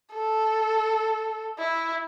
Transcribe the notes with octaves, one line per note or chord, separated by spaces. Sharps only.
A4
E4